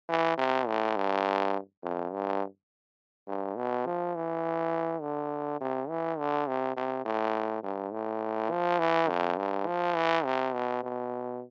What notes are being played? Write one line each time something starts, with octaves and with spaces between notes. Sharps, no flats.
E3
C3
A2
G2
F2
G2
G2
B2
F3
E3
D3
C3
E3
D3
C3
C3
A2
G2
A2
F3
E3
F2
G2
F3
E3
C3
B2
B2